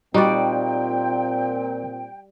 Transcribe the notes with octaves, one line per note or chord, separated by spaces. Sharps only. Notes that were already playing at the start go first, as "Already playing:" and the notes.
A#2 G3 C4 D#4 F#4 D5 G5